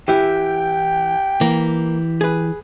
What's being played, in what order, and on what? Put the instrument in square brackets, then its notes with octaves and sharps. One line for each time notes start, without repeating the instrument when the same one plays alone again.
[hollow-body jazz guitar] E3 E4 [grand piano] G4 [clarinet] G5
[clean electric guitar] E3 [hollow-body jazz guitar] A#3
[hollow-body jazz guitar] G#4 B4